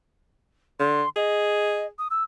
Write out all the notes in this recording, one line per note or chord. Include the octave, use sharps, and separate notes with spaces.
D3 C6
G#4 D#5
D#6
E6